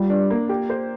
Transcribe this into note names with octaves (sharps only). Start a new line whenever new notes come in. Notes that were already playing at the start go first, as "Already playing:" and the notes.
Already playing: G3 F4
D4
A#3
G4
C5